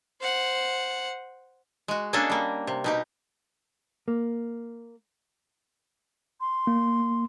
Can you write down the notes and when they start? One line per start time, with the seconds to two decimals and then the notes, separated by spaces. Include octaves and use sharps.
0.21 C5 F#5
1.88 G#3 F#4
2.13 A#3 C#4 D4 F#4 G#4 A4
2.30 G3 A#3
2.67 C3
2.84 B2 D#4 G4
4.08 A#3
6.41 C6
6.67 A#3